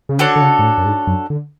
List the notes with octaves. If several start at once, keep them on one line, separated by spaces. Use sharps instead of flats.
C#3
D3 D4 F#4 A4 C#5
D3
C#3
G#2
A2
F#2
G#2
F#2
D3